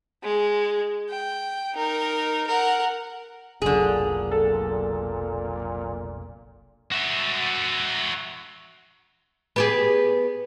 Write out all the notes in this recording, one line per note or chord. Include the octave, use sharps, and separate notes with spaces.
G#3
G5
D#4 A#4
A#4 F#5
F1 B1 A#2 D3 F#3 G#4
A4
F#4 E5
B3 G4 G#4